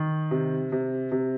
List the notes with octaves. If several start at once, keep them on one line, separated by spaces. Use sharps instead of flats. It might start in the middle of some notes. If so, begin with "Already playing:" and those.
Already playing: D#3
C3
C3
C3